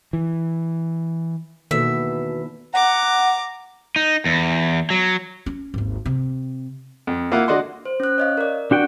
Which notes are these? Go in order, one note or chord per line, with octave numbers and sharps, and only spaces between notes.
E3
E2 B2 D#3 A#3 A4 E5
F#5 A#5 D6
D#4
E2
F#3
C#4
G#1 D#2
C3
F2
A#3 E4 F4 F5 F#5
D3 F#4 D5 D#5 F#5 C6
C5
C#4 F#6
C#5 D#5 F5
A#4 D5
D4 F#4 G5